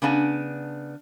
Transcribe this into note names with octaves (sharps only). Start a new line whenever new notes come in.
C#3 B3 D4 G#5